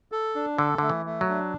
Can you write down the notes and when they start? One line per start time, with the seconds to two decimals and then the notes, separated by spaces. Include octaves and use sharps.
0.12 A4
0.35 D4
0.58 D3 A4
0.78 D3 A3
0.90 E3
1.06 A3
1.21 F#3
1.29 D4